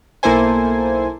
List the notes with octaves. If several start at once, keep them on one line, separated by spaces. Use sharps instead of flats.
B1 A#3 E4 A4 C5 G#5